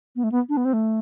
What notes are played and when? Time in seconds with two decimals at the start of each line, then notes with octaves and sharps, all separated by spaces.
0.16 B3
0.24 A3
0.32 B3
0.49 D4
0.57 B3
0.65 C4
0.73 A3